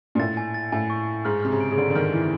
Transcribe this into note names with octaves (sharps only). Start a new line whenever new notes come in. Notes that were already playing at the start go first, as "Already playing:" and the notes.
A#2
A2 A6
G#5
A6
A2 G#5
C#6
G#5
G#2 F6
C3 F6
C#3
D7
C#3
D3 D7
D3
D#3 F6
E3 F6